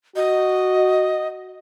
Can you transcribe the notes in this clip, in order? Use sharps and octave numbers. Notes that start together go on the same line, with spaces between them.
F#4 D#5